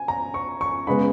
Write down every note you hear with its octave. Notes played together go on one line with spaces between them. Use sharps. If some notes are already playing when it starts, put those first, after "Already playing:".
Already playing: G#5
A#5
C#6
C#6
C#3 G#3 B3 B5